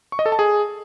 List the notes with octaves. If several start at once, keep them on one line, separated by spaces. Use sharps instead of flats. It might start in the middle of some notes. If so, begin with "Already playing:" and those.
C#6
D#5
A4
A5
G#4